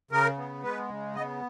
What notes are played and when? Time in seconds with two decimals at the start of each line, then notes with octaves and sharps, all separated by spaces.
0.11 C#3 A#4
0.37 B3
0.63 G#3 B4
0.89 C#3
1.15 B3 D#5